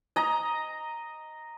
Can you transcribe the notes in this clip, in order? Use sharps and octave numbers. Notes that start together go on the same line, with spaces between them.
D#5 A#5